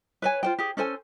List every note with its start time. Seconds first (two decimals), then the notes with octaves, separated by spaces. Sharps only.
0.22 B4 C#5 G#5
0.43 F4 C5 G5
0.59 G4 G#4
0.77 C#4 A4 C5 G#5